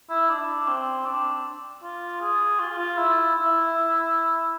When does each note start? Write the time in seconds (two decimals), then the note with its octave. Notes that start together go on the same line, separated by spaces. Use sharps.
0.10 E4
0.29 D4
0.68 C4
1.05 D4
1.83 F4
2.20 G#4
2.59 F4
2.78 F4
2.98 E4
3.35 E4